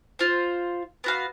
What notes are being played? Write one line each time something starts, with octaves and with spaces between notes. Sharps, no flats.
F4 C5
B3 F#4 F5